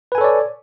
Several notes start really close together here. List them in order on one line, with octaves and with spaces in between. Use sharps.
B4 G#5 A4 C#5 D5